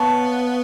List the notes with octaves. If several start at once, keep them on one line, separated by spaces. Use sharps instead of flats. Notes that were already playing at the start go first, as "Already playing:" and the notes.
Already playing: B3 C#5 F5 A5